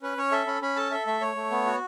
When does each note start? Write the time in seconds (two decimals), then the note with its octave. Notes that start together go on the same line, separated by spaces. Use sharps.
0.02 C#4 B4
0.18 C#4 C#5
0.32 A4 E5
0.47 C#4 B5
0.61 C#4 B5
0.76 A4 A5
0.91 A4 E5
1.07 A3 E5
1.21 A3 C#5
1.35 A3
1.50 B3
1.66 F#4